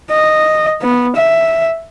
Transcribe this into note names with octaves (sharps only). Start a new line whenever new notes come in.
D#5
B3
E5